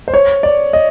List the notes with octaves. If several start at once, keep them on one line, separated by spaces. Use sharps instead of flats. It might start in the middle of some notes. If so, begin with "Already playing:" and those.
C5
C#5
D5
D#5